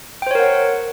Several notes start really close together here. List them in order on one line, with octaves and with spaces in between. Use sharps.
G5 C5 C#5 A#4 F#5